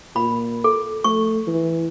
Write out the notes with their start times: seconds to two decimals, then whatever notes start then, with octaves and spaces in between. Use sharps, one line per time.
0.16 A#2 B5
0.64 A4
1.04 A3 C#6
1.47 E3